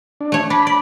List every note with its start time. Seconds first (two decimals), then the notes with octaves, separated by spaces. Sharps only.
0.21 D4
0.32 A3 C#5
0.50 D4 B5
0.67 D5